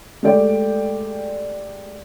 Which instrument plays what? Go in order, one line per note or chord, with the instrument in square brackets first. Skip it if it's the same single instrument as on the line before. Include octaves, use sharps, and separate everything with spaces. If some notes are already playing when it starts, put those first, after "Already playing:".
[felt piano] G#3 A3 G4 D5 G5